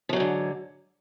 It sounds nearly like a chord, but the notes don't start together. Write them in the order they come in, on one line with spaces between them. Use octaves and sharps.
F3 F#3 G#2 D3